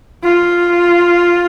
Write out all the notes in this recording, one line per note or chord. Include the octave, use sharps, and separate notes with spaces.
F4